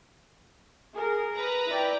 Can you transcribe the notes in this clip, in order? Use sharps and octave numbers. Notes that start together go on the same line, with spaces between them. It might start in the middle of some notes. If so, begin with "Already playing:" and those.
G#4 A#4
B4 A#5
E4 D5 G5